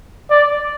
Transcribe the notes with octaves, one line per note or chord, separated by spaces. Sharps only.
D5